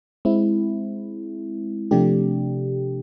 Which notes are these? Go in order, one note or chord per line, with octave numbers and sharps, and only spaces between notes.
G#3 C4 E4
C3 F3 A3 D4 G4